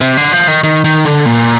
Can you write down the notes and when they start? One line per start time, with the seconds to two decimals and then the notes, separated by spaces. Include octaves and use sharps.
0.01 C3
0.17 D3
0.32 F3
0.48 D#3
0.64 D#3
0.85 D#3
1.05 D3
1.26 A#2